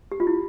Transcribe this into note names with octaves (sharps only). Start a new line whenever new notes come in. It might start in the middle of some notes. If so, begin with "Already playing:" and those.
G4
F4
E4